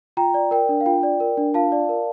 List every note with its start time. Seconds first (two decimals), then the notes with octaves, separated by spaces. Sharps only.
0.17 F4 G5 A#5
0.34 D5
0.51 A#4 G5
0.69 D4
0.81 F5
0.86 F4 G5
1.03 D5
1.20 A#4
1.38 D4
1.54 F4 F5 A5
1.72 D5
1.89 A#4